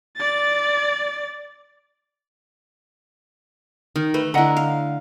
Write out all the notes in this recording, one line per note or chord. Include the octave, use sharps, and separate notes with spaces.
D5 A6
D#3
A3 B4
D3 E4 D#5 F#5 A#5
F5